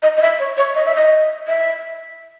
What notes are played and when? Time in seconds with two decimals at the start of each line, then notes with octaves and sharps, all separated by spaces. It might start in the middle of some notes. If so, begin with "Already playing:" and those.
0.02 D#5
0.17 D#5
0.21 E5
0.39 C#5
0.57 C#5
0.74 D#5
0.85 E5
0.95 D#5
1.47 E5